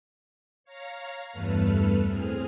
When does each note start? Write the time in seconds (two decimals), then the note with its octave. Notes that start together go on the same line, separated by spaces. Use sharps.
0.64 C#5 F5 A#5 C#7
1.32 E2 G2 A3 A4 B4 F6
2.04 A2 C4 G#4 F6